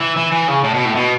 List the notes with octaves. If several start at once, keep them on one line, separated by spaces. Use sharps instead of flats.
E3
E3
E3
C#3
A2
B2
A2
B2